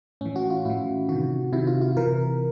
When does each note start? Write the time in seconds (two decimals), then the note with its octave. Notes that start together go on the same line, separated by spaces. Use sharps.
0.21 A2 E3 C#4
0.36 F#4
0.50 F4
0.65 A2 E3 E4
1.09 C3 D#3 F#4
1.53 C3 D#3 E4
1.67 F4
1.82 F4
1.96 C3 E3 A#4